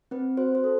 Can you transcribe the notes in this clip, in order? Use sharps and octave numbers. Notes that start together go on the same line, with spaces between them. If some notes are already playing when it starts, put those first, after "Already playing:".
C4 B4
F#4 C5
C5
A4